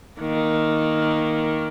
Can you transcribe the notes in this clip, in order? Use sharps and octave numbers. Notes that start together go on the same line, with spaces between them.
D#3 A#3